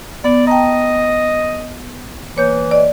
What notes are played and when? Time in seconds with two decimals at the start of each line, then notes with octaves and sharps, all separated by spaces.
0.24 B3 D5
0.47 D#5 G5 A5 A#5
2.36 E3 A#3 C#5 G6
2.71 D5 D#5